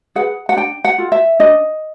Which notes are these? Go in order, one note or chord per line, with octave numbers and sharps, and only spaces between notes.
G#4 B4 F#5
F#5
D4 G5
F#5
F4 A4
E5
D4 D#5